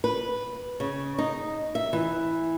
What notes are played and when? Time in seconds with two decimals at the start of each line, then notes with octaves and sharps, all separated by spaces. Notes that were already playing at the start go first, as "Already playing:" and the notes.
0.04 B4
0.80 C#3
1.18 D#4
1.75 E5
1.93 E3